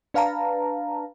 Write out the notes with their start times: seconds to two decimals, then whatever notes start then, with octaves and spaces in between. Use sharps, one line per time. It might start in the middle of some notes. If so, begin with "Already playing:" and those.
0.14 D4 B4 F5 A5 A#5